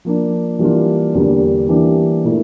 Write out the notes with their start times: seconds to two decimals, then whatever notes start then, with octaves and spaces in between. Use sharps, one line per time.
0.05 F3 A#3 D4
0.59 E3 G3 A#3 D4 F4
1.14 E2 D3 G3 A#3
1.69 E3 G3 A#3 D4 G4
2.24 A#2 A3 E4 A#4